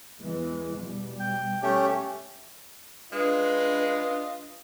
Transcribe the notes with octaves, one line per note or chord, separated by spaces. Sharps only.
E2 E3 G#3
B2 G3
G5
A3 C#4 G4
G#3 D4 F4 B4 D#5